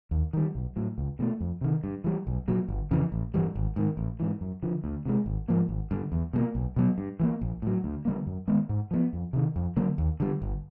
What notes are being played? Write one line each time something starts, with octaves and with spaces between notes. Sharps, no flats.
D#2
D#3 G3
B1
A2 F#3
C#2
B2 F#3 A3
F2
C3 D#3
G2
E3 G3
B1
A#2 F#3
G1
F2 C#3 E3
A1
G2 E3 G3
G#1
G#2 D#3
A1
G#2 E3
F#2
D3 F3
D2
C3 E3 G#3
G#1
G#2 F3 A#3
G#1
G2 D3
E2
B2 G3 A#3
B1
B2 F#3 B3
G2
E3 G3 A#3
A#1
A2 F#3
D2
D3 G3 A#3
F#2
D#3 G#3 B3
G#2
F3 G#3 B3
F2
C3 D#3
F2
D3 F#3 A#3
D#2
D3 G3
G1